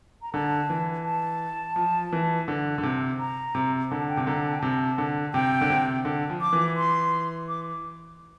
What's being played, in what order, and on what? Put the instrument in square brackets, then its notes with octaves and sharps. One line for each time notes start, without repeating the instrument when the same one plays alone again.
[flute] A#5
[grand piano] D3 [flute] A5
[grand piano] E3
[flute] A5
[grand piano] F3
E3
D3
D3
C3
[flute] A#5
[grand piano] C3
[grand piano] D3 [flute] A5
[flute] G5
[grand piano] C3
[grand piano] D3 [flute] A#5
[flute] A5
G5
[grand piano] C3 [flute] A5
[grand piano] D3
[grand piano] C3 [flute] G5
[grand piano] D3
C3
D3
F3
[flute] D6
[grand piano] E3
[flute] C6
D6